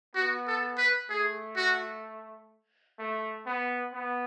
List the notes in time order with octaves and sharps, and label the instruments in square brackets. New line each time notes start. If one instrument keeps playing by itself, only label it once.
[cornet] B3 [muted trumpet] F#4
[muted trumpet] A4
B4
[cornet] A3 [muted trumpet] G#4
[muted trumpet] F#4
[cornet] A3
B3
B3